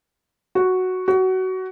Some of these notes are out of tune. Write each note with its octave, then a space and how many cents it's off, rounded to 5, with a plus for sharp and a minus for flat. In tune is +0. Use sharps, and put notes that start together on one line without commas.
F#4 +0
F#4 +20